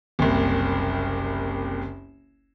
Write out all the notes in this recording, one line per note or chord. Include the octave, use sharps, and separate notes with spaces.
F#1 C2